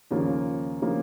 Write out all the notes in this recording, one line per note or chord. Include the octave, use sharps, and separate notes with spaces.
D#2 C#3 F3 A#3 F4
C#3 F3 A#3 F4